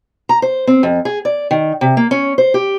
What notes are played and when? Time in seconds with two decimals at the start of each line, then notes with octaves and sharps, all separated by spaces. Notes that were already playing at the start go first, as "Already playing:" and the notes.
0.29 A#5
0.42 C5
0.67 C4
0.83 F2
1.05 G#4
1.25 D5
1.51 D#3
1.81 C3
1.97 A#3
2.11 C#4
2.38 C5
2.54 G4